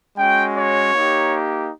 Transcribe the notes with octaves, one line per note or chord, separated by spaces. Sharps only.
G#3 C#4 F#4 G5
C#5
A#3 D#4 G4